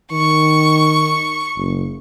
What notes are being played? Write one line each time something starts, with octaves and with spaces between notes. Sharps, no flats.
D#3 C#6
F#1